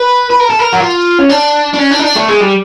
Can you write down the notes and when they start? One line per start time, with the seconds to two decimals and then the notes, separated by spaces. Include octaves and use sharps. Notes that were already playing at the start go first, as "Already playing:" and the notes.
Already playing: B4
0.30 B4
0.40 A#4
0.50 A4
0.59 A#4
0.73 F#4
0.80 F4
1.19 C#4
1.29 D4
1.74 D4
1.78 C#4
1.91 D4
1.99 D#4
2.04 D4
2.16 A3
2.29 G#3
2.41 G3